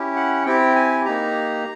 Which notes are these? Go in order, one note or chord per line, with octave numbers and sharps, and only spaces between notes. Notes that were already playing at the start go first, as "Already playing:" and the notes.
Already playing: C#4 E4 G4
F#5
C4 E4 G4 G5
G#5
A#3 D#4 G4 A#5